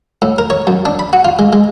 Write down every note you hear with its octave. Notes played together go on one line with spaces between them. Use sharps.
A2
A#4
C#5
F#2
D4
B5
F#4
F4
G#3
G#3